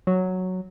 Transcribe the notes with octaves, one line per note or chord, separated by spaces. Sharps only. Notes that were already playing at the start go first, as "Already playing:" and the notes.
F#3